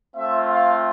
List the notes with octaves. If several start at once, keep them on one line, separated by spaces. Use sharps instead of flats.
A3 C4 F4 E5
F5